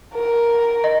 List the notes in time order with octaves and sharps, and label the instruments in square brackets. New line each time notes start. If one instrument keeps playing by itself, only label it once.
[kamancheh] A#4
[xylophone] D#5